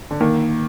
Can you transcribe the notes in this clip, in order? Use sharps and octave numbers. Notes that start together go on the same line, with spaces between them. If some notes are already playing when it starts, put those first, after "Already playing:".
D3
D#3 A#3